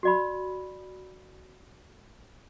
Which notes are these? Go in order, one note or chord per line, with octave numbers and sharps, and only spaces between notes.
F#4 D5 B5